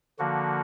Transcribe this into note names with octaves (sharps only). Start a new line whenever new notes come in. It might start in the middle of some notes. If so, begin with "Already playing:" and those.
D3 F3 A#3 F#4